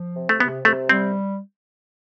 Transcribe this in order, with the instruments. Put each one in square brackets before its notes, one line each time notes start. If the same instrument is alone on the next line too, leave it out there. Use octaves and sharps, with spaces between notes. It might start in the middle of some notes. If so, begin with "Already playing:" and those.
Already playing: [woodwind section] F3
C3
[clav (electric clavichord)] A3
[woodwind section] C3 [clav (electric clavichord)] B3
[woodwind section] C3 [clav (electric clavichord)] A3
[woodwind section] G3 [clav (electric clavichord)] C4